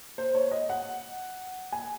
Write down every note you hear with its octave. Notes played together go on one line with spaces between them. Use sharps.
C5
C#5
D#5
F#5
G#5